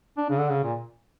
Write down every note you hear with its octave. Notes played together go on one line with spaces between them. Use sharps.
D4
C#3
D3
C#3
A#2